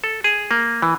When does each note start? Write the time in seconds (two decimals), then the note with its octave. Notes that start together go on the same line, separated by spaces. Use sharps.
0.04 A4
0.24 G#4
0.51 A#3
0.82 E3